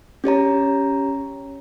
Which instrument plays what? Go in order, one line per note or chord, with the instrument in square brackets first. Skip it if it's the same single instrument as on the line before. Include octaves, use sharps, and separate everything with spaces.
[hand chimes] C#4 G4 C#5 A#5